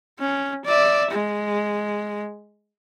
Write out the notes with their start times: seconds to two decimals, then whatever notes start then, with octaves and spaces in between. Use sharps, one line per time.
0.20 C#4
0.65 D5 E5
1.11 G#3